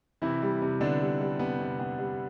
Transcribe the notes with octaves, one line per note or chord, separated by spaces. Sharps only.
C3 E3 E4
G3
C3
D3 B3 D4
G3
G3
C3 B3
C3
B3
G3